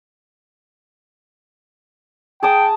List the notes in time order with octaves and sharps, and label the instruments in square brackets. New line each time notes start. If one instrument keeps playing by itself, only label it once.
[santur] G#4 A5 D#6 [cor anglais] G5